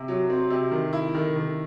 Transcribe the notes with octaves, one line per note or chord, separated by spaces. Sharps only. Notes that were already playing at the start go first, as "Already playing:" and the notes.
Already playing: C3
F#3
C4
C3
D#3
E4
D#3
D#3